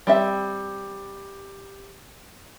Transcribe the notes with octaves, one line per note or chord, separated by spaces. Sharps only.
G3 C4 E5